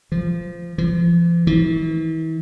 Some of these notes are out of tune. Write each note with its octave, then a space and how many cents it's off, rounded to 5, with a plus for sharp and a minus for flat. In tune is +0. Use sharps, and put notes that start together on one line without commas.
F3 -15
F3 -40
E3 -40